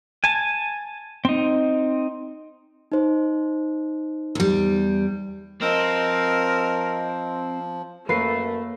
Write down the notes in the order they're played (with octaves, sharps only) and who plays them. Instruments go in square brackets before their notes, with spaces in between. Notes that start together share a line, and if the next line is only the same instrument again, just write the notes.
[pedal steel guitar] G#5 A5
C4 D#4
[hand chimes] D#4 C5
[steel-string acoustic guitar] E2 G3
[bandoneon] F3 [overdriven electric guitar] C4 [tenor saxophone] A#4 [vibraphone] D#5
[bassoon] F#2 [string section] A3 [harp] A#3 C7 [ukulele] B4